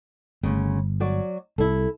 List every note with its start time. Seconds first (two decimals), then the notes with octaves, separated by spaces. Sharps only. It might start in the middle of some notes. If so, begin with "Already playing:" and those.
0.43 G1 D2 C#3
1.00 F#3 F#4 D5
1.58 C2 E4 A4